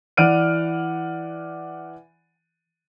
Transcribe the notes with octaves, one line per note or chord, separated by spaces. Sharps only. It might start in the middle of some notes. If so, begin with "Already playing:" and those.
E3 D5 F#5 F6 D7 D#7